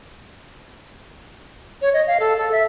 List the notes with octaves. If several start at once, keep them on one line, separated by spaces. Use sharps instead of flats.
C#5
D#5
F5
A4
A4
E5